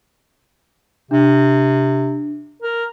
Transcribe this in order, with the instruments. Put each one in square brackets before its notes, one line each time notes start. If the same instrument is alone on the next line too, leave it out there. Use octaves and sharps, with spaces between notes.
[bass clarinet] C3 [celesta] D4
[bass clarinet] A#4